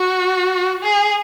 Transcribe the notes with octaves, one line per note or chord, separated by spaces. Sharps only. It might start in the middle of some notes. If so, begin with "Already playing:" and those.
Already playing: F#4
G#4